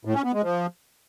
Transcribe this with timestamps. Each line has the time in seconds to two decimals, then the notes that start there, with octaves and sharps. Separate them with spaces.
0.05 A2
0.15 C#4
0.24 B3
0.33 G#3
0.43 F3